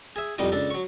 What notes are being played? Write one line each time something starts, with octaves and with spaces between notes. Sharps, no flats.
G#4 E5
C2 F2 G3 D#4 G4 D#6
C#2 D4 A4
F#3 C#6